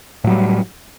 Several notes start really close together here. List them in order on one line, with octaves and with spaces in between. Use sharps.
A2 F#3 G3